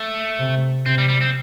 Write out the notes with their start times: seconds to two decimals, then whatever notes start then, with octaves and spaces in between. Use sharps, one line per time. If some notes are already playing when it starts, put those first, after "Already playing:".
Already playing: A3
0.39 C3
0.86 C3 C4
0.98 G3
1.09 G3
1.21 C4